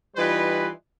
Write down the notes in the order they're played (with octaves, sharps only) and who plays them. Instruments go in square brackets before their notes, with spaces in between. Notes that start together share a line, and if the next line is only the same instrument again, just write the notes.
[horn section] E3 G3 D#4 F4 B4